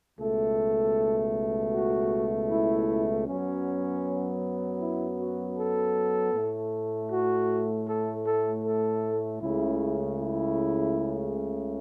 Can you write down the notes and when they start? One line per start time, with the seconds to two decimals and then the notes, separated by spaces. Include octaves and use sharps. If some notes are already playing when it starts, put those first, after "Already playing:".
0.19 C#2 B2 A3 A4
1.72 F#4
2.50 E4
3.26 F#2 F#3 B3 C#4
4.80 E4
5.18 F#4
5.57 A4
6.33 A2 A3
7.10 F#4
7.86 A4
8.25 A4
8.64 A4
9.40 C#2 C#3 A3 E4
10.18 E4